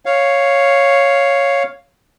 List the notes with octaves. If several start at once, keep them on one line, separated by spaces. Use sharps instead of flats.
C#5 F5